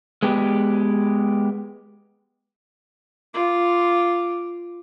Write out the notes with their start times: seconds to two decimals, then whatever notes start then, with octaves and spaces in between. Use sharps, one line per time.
0.23 G#3 B3 G4
3.34 F4 D6